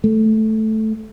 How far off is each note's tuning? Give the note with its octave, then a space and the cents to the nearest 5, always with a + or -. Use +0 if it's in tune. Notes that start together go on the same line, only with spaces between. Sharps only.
A3 -5